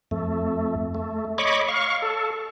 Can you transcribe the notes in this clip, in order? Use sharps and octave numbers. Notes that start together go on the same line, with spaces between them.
F2 A3
A3
C#5 D#5 B5 C#6 D6
F5 C#6
A4